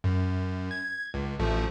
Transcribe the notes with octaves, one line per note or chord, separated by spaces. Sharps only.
F#2
G#6
C#2
A1 F3 A3